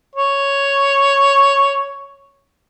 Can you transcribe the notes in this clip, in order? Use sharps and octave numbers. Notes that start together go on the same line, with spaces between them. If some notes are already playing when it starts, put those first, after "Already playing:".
C#5